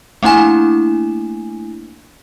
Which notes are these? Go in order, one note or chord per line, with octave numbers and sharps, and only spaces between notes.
A3 A#3 D4 E4 G#5 E7